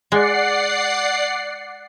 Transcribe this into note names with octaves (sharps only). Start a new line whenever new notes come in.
G#3 D5 F#5 C7